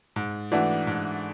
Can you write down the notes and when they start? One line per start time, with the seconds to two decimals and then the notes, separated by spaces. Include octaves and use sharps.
0.16 G#2
0.52 E3 A3 D4 F#4
0.87 G#2